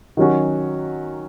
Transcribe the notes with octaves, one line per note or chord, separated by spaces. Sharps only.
D#3 F#3 C#4 F#4